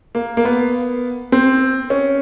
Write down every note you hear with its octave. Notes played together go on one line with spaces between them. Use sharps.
A#3
A#3
B3
C4
C#4